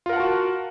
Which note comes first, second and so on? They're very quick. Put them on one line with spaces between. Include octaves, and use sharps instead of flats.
F4 A#4 F#5 A5 F#4